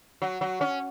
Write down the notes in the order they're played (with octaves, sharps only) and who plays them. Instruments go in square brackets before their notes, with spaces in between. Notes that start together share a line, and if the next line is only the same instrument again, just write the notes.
[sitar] F#3
F#3
C#4